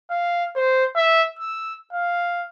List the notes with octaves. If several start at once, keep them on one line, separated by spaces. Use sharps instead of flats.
F5
C5
E5
E6
F5